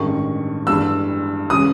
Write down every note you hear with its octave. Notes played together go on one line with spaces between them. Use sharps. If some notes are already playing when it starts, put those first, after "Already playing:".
Already playing: A1 G2 D#3 G#3 C#6
G1 G2 E3 G#3 E6
C#3 E3 G#3 D#6